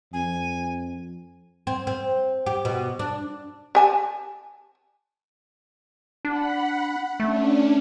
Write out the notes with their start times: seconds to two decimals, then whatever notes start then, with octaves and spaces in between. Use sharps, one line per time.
0.13 F2 G#5
1.67 C4
1.87 C4
2.46 G4
2.65 B2
2.99 D4
3.75 G4 G#5 A5
6.25 D4 F#5 B5
7.20 A3 C#4 D4